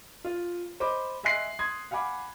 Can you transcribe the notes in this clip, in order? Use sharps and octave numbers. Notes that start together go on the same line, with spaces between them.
F4
C5 D#5 B5 D6
D#5 E5 G#5 C6 F#6 C7
C6 D#6 G#6
F5 F#5 G#5 B5 D6